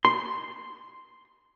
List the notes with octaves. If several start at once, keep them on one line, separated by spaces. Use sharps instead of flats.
C6